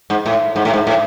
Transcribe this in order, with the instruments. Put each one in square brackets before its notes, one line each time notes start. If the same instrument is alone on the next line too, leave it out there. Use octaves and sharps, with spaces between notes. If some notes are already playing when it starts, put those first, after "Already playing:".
[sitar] G#2
A2
G#2
A2
G#2
A2